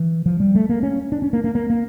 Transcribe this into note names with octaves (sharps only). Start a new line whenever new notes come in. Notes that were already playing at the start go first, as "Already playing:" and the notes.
Already playing: E3
F3
G3
A3
A#3
C#4
D4
C#4
A#3
A#3
A#3
A#3